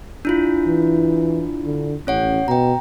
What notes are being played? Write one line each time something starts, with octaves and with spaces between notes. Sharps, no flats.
D4 E4 F4
E3
D3
A1 C#4 C#5 F#5
B2 G5 A#5